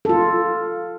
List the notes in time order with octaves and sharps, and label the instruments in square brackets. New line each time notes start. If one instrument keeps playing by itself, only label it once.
[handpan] F4 A4